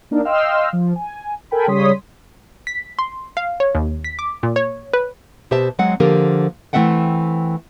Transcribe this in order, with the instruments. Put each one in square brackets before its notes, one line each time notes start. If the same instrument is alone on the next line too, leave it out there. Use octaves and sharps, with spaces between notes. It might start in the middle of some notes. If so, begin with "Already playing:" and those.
[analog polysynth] A#3 D4 D#4 A#4
D#5 F5 G5 C6 E6 F6
F3
G#5
A4 A#4 G5 G#5 B5
C#3 G3 C#5 C6 D#6 B6
[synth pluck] B6
C6
F5
C#5
D#2
B6
D6
A#2
C#5
B4
[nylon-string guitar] B2 G4 C5 E5 A5
F#3 G#3 C4 F#5
D3 F3 A#3 G4 A#4
E3 A3 C4 E5 F#5 G5